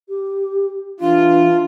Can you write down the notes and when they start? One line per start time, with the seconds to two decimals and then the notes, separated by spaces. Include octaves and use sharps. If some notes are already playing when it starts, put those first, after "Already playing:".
0.08 G4
1.00 E3 D4 F4